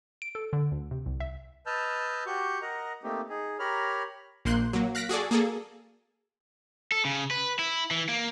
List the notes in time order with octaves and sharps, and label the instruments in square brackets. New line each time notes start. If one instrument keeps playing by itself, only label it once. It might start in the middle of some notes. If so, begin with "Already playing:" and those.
[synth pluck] D7
A4
D3
D2
C3
C2
E5
[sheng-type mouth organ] B4 D#5 A5 E6 F6 G6
F#4 G4 C#6 G6
A#4 D#5 F#5 A#5
A3 A#3 C4 D#4 G4
D#4 G#4
G4 A#4 C#5 A#5 B5 F6
[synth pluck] A#1 A#3 C6 F#6 G6
F#3 A#3
F5 F#6 A#6 B6 D7
F#4 G#4 A4 D5
A#3 G#4 A4
[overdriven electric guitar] A4
C#3
B4
E4
E3
A#3